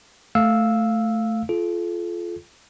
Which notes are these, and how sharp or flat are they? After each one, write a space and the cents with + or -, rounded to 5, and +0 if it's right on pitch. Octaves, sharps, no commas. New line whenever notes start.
A3 +0 F5 +0 E6 -10
F4 -10 A4 -35